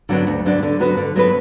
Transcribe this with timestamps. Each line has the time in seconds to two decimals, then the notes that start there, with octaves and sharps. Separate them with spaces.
0.09 D3 F#3 B3 D4
0.27 D2
0.45 D3 F#3 B3 D4
0.63 D3
0.80 F#3 B3 F#4 B4
0.97 D3
1.16 F#3 B3 F#4 B4